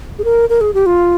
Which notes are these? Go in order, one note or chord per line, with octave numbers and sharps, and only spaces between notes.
G#4
A#4
A#4
G#4
G4
F4